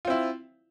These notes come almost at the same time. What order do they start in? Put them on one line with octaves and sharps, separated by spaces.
F4 C4 E4